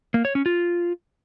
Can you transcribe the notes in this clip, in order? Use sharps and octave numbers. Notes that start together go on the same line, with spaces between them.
A#3
C#5
C#4
F4